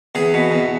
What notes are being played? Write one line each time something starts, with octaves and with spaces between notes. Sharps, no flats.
E2 G#4
B2
E2